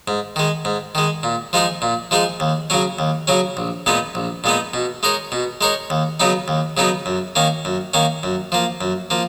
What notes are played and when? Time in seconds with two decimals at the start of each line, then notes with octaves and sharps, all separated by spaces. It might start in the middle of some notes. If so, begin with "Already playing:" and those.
0.08 G#2
0.36 D#3 G#3
0.65 G#2
0.95 D#3 G#3
1.23 A#2
1.53 F3 G#3 D#4 G#4
1.82 A#2
2.11 F3 G#3 D#4 G#4
2.40 D#2
2.70 C#3 F#3 C#4
2.99 D#2
3.27 C#3 F#3 C#4
3.57 A#1
3.86 A#2 G#3 B3 D#4
4.15 A#1
4.44 A#2 G#3 B3 D#4
4.74 B2
5.03 G#3 D#4 A#4 C#5
5.32 B2
5.61 G#3 D#4 A#4 C#5
5.90 D#2
6.20 C#3 F#3 B3 D#4
6.48 D#2
6.77 C#3 F#3 B3 D#4
7.06 F#2
7.36 D#3 A#3 C#4
7.65 F#2
7.94 D#3 A#3 C#4
8.23 F#2
8.52 F3 A#3
8.81 F#2
9.10 F3 A#3